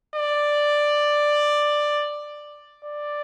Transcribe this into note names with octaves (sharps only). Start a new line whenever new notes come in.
D5
D5